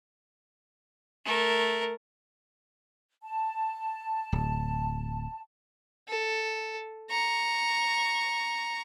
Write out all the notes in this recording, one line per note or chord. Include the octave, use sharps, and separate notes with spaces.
A3 A#4
A5
D1
A4
A#5 C#6